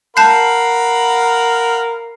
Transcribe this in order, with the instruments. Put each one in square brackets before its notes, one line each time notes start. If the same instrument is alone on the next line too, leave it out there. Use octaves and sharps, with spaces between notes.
[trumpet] A#4 [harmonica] F5 F#5 B5 [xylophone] A5 F#6 G6 [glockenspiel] C7